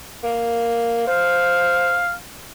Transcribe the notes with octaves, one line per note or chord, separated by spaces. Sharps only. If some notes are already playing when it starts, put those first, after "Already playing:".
A#3
C5 F5